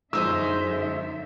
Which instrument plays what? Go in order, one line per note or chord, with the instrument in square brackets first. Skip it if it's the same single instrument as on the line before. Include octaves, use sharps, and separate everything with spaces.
[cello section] F#2 D3 E5 [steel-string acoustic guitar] G#3 D#4 C5 [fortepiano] E6